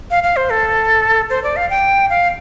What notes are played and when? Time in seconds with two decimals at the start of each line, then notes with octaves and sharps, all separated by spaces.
0.11 F5
0.23 F5
0.36 C5
0.50 A4
1.30 C5
1.44 D5
1.56 F5
1.70 G5
2.10 F5